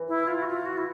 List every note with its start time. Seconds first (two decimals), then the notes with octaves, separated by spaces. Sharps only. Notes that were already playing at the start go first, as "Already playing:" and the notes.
Already playing: E3
0.08 E4
0.27 F4
0.42 F#4
0.47 F4
0.66 F#4
0.77 E4